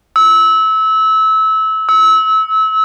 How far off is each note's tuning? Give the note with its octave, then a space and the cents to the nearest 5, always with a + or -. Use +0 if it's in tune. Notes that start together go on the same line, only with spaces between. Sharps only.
E6 -25
E6 -30